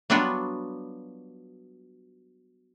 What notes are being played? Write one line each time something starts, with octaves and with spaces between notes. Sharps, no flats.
F#3 G3 B3 D4 F4 F#4